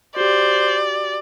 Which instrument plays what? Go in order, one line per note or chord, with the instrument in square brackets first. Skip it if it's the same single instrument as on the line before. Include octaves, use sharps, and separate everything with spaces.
[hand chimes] F#4 G4 [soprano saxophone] C5 [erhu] D5